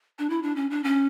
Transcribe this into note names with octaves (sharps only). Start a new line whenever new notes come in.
D4
E4
D4
C#4
D4
C#4